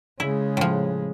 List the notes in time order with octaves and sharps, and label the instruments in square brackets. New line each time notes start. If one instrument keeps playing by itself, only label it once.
[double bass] C#3 G#3 [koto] E4
[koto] A2 F3